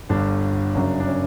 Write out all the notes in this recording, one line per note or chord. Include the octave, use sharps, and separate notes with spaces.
G1 G2 D3 G3 D4
F#1 F#2 C#3 F#3
D4
C#4